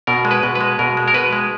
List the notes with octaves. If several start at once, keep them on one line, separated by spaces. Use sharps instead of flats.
B2 A#4
G#3
B4
B2
B4
G#3
B2 A#4
G#3
A#4
B2 B4
G#3